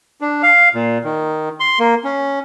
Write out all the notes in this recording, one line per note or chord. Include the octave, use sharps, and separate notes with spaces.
D4
F5
A#2
D#3
C6
A#3
C#4